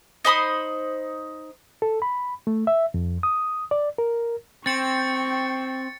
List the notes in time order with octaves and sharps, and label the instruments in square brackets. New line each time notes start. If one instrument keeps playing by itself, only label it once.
[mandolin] D#4 C5 B5 D#6
[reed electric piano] A4
B5
A3
E5
F2
D#6
D5
A#4
[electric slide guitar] C4 [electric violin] G5 C#6 [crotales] A6 C#7